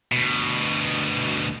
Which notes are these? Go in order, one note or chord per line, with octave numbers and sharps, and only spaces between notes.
D2 B2